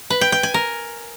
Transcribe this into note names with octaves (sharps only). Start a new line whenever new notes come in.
B4
G5
G5
G#5
A#4